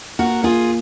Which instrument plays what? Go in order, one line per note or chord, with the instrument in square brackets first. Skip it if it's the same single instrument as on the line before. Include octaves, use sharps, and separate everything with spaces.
[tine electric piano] A#3 [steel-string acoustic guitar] F#4 A#4
[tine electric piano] A#3 [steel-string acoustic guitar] F4 G#4